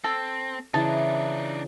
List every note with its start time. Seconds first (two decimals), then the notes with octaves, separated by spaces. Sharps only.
0.04 C4 A4
0.74 C#3 E3 D4 D#4 A5